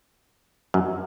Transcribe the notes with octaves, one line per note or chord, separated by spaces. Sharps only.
F#2